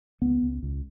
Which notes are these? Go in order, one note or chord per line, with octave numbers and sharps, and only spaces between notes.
C#2 B3
C#2
C#2